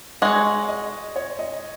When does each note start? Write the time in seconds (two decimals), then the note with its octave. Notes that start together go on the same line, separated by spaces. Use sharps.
0.22 G#3 F#4 C#5 D#5
0.69 D#5
1.16 C#5
1.39 D#5